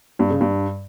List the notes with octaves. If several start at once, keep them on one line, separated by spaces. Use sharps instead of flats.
G2
C#3
G2